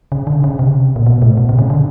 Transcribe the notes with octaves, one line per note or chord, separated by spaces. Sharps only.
C#3
D3
C#3
C3
A#2
B2
A2
B2
C3
C#3
D3